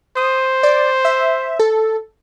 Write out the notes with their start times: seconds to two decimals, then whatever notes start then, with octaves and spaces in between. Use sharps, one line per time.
0.17 C5 D#6
0.63 D5
1.05 E5
1.59 A4